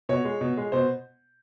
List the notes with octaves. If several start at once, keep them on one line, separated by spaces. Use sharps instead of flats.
B2 C#5
G#3
B2
G#3
B2 C5